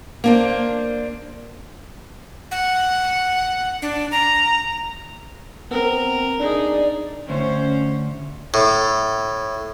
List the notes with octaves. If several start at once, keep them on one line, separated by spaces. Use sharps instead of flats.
A#3 D4 C5
F#5
D4
A#5
B3 C4 A#4
D4 D#4 G#4 D5
D2 C#4 C5
A2